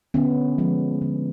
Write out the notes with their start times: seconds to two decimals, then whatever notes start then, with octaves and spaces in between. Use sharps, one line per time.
0.14 D3 B3 C#4
0.58 F3 G#3
1.01 D3